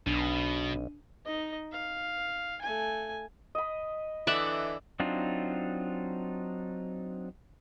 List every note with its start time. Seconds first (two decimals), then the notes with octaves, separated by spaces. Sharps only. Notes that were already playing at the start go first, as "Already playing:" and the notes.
0.07 B1 B2 D4
1.26 D#4 D#5
1.72 F5
2.62 A3 G#5
3.55 D#5 B5
4.27 D3 E3 D5 E5 F#5
5.00 F#3 C4 D4 D#4 F4